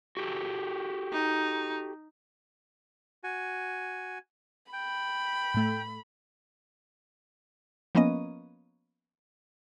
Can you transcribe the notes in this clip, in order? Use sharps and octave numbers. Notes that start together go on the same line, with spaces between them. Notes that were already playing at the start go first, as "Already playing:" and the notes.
F#4 G4 A4
D#4
F#4 G#5
G5 B5
A2 A3
F3 A#3 B3 C#4 D#5